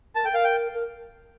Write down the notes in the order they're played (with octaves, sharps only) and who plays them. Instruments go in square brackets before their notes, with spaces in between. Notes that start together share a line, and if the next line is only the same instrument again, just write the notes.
[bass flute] A#4 [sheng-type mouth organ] A5
[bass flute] A4 [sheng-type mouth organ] G5
[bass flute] A#4 [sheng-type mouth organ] F5
[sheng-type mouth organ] G5
[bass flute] A#4